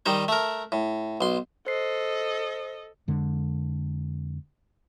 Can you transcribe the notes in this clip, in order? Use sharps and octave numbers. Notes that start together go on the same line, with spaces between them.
D#3 G3 D#4 C5
A3 A#4
A2
B1 C6
A4 C5 D#5 C7
F2 D3 G#3